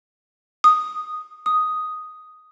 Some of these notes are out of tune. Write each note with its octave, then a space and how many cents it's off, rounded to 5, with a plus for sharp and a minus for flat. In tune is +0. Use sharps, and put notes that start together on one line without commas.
D#6 -10
D#6 +0